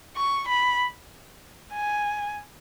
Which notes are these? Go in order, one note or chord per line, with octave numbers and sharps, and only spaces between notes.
C#6
B5
G#5